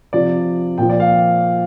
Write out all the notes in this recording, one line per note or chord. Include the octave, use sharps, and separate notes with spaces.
C3 F3 D5
A#2 F3 G5
D5
F5